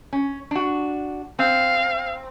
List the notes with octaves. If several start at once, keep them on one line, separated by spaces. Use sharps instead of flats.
C#4
D4 F#4
C4 F5